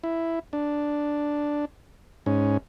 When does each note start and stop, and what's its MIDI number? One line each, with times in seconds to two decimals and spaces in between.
0.04 0.39 64
0.53 1.65 62
2.26 2.57 44
2.26 2.57 61